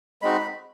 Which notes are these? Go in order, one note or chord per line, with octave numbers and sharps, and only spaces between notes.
G#3 C4 D#4 F#4 B5